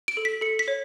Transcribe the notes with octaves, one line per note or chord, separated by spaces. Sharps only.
D7
A4
B6
A4 C#7
B6
C#5